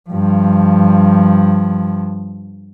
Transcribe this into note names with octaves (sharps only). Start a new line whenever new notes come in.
G2 F3